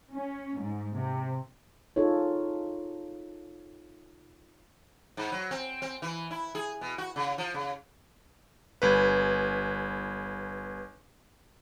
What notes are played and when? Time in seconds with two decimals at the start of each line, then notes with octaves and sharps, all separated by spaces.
0.13 C#4
0.60 G#2
0.95 C3
1.96 D#4 F4 G#4 A4 C#5
5.17 G#2
5.32 F#3
5.51 C4
5.82 C4
6.02 E3
6.31 E4
6.55 G#4
6.81 B2
6.98 F#4
7.16 C#3
7.38 F3
7.54 C#3
8.82 G1 B4